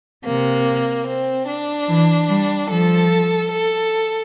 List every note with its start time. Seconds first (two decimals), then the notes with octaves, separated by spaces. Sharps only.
0.25 C3 A#3
1.07 C4
1.47 D4
1.88 E3
2.29 G3
2.70 F3 A4
3.52 A4